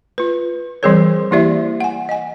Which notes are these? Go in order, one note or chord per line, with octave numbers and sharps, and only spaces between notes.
F4 B4
E3 G3 C4 G#4 A#4 C#5
E3 A#3 E4 G4 D5 E5
F#5 G#5
D#5 G#5